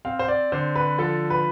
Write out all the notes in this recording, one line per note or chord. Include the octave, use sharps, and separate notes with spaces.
C4 F5
C5
D5
D3 C5
B4
F3 A4
B4